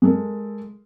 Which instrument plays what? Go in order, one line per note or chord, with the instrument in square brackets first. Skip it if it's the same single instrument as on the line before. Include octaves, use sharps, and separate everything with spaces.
[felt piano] G#3 A4 A#4